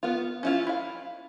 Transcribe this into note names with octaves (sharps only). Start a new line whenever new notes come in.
B3 F4
C#4 E4 F4
E4 F5